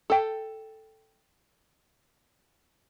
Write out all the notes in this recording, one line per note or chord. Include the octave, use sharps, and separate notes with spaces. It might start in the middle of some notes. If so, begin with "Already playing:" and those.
A4 G5